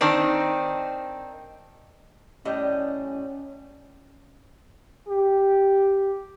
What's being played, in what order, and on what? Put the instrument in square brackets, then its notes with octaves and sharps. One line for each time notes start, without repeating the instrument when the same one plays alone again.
[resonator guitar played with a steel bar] D#3 C4 D4 D#4
[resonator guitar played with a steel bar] A2 G3 D#5 [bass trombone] C#4
[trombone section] G4